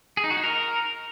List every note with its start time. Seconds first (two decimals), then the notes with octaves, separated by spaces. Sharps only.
0.17 G#4
0.24 D#4
0.30 F#4
0.37 D#4
0.43 A#4